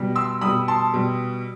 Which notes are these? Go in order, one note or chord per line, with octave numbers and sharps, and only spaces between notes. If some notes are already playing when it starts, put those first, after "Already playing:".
Already playing: B2 G3
C6 E6
B2 G3 B5 D#6
A5 C6
B2 G3